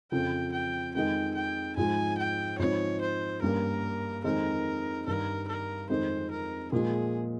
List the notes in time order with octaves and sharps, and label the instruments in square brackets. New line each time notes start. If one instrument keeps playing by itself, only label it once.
[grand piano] F2 C#3 F3 C4 [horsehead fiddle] G5
[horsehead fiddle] G5
[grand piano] F2 D#3 G#3 D#4 [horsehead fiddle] G5
[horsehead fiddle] G5
[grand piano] G#2 F3 G#3 [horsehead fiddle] G#5
[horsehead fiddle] G5
[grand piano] G#2 F3 C4 D#4 [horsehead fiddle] C#5
[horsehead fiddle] C5
[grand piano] G2 G3 A#3 C#4 [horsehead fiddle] A#4
[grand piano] F2 D#3 G#3 C4 D#4 [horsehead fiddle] A#4
[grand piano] G2 D#3 G3 [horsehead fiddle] A#4
[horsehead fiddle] A#4
[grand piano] F2 D#3 G#3 C4 D#4 [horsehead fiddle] C5
[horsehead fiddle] A#4
[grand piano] A#2 F3 G#3 [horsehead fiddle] G#4